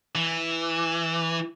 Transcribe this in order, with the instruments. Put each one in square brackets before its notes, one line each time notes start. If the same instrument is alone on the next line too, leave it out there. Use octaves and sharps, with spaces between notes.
[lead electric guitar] E3